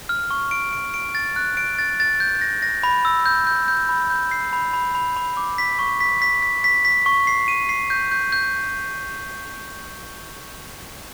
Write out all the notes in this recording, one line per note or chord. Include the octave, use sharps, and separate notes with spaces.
F6
C#6
D7
D7
D7
A6
F#6
D7
A6
A6
G6
A#6
A#6
B5
E6
G6
G6
G6
B5
G6
C7
B5
B5
B5
B5
D6
B6
C#6
B6
B6
B6
B6
B6
C#6
C7
D#7
C7
G6
G6
G6